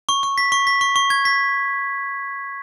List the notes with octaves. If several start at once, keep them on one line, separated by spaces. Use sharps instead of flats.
C#6
C#6
B6
C#6
B6
C#6
C#6
G#6
B6